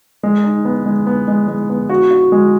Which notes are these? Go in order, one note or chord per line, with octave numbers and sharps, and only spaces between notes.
G#3
D#4
B3
G#3
B3
G#3
G#3
B3
F#4
F#4
G#3